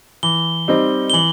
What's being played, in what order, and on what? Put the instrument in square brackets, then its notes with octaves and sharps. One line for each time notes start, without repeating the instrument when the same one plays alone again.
[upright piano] E3 [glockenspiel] G7
[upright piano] G3 C4 D#4
[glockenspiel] G7
[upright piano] E3 [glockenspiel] F#7